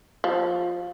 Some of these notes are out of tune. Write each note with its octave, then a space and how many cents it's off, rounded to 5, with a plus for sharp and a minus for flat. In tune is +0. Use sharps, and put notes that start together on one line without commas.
F3 +15